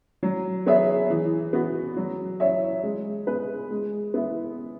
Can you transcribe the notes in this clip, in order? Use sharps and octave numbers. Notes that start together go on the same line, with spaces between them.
F#3
B3 G#4 C#5 E5
E3
B3 F#4
F#3
E4 C#5 E5
G#3
B3 G#4 B4
G#3
B3 E4